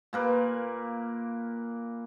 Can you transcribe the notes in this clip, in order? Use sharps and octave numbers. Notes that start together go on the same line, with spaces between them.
A#2 A#3 B4